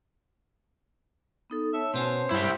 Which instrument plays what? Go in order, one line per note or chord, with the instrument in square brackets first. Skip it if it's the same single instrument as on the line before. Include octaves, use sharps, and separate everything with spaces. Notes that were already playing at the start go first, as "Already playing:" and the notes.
[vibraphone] B3 D#4 A4
[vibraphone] C#5 A5 [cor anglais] E5
[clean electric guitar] B2 B3 C#4 [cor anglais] C5
[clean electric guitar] G2 [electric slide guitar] E4 G4